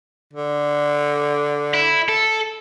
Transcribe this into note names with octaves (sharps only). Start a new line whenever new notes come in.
D3
E4
A4